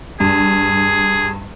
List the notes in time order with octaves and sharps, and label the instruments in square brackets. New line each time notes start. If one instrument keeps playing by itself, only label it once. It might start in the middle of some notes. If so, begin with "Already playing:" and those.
[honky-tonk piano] G2 [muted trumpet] G#4